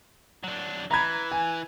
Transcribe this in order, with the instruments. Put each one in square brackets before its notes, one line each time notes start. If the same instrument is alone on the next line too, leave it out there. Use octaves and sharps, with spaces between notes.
[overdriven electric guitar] F#3 D4
[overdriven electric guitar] E3 [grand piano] A#5 B5 G#6
[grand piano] G#5